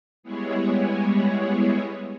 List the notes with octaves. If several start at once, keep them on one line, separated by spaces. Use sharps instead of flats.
G3 G#3 B3 E4 G#4 C#5